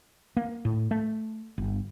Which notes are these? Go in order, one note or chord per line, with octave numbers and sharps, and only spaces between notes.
A#3
A2
A3
G1